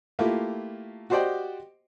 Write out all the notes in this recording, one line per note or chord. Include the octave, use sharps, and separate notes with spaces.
A3 A#3 E4 F4 G4
F#4 G4 C5 D5 D#5 G5